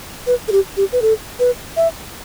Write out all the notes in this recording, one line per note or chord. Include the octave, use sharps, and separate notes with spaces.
B4
A4
G4
G4
B4
A4
B4
E5